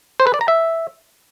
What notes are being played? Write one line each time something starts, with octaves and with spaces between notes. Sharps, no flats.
C5
B4
D5
A#5
E5